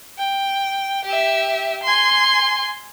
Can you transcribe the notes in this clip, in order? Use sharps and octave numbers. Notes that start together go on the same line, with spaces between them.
G5
G4 E5
G#5 C6